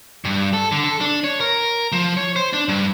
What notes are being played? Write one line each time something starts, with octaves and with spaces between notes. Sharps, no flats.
G2
A4
D3
A4
D4
C#5
A#4
F3
C#5
C5
D4
G2